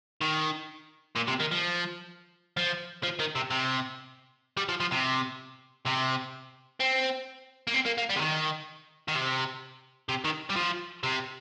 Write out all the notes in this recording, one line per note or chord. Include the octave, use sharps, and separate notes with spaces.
D#3
A#2
C3
D#3
F3
F3
F3
D#3
C3
C3
G3
F3
F3
C3
C3
C4
A#3
C4
A#3
A#3
G3
C3
D#3
D#3
C3
C3
D#3
G3
F3
C3